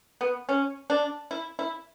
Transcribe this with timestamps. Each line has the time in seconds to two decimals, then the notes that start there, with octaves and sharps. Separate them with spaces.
0.21 B3
0.49 C#4
0.90 D4
1.31 E4
1.59 E4